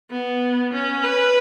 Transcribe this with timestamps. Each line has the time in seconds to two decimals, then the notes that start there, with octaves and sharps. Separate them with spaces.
0.11 B3
0.73 C#4
1.04 B4